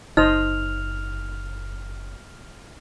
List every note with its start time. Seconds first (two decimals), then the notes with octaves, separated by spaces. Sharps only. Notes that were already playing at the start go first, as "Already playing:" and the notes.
0.17 F#1 D#4 C5 D#5 F6 F7